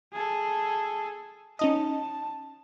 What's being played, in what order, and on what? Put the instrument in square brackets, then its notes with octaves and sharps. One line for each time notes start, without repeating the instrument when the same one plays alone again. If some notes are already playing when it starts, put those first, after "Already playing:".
[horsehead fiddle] G#4 A4
[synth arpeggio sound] C#4 D#4 D#5 [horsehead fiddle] A5